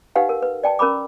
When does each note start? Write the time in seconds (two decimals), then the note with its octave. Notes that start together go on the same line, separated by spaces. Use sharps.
0.16 D#4 G4 B4 F5 F#5
0.29 A#4
0.42 B4
0.64 D5 G5 A5
0.79 C#4 A#4 A#5 B5 D6